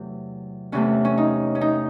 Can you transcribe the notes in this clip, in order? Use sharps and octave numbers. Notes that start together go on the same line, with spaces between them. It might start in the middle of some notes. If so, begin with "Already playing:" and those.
Already playing: E2 C3 F#3 A3
E2 C3 E3 A3 C#4
C#4
D#4
C#4
D#4